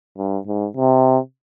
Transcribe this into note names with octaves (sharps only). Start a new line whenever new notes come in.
G2
G#2
C3